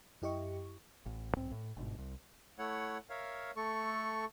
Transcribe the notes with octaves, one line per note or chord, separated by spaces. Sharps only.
F#2 E4 G4 D#5 C#6
A1
B1 G#2 C4
A2
G1 G#2 B2
C2
A3 E4 C#5 F#5
A#4 C#5 E5 F5
A3 A4 C#6